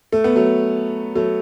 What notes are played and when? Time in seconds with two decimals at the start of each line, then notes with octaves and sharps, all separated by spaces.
0.12 A3
0.24 B3
0.36 F#3 A3
1.15 F#3 A3